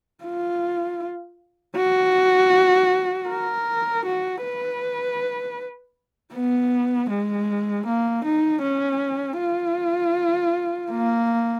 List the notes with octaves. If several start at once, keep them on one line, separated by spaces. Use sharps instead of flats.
F4
F#4
A#4
F#4
B4
B3
G#3
A#3
D#4
C#4
F4
A#3